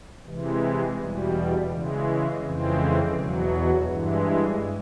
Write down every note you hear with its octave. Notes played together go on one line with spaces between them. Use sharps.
C3 E3 G#3
E2 B2 G3
C#3 E3 G#3
F2 C#3 E3 G#3 C4
E2 B2 F#3
G2 E3 G#3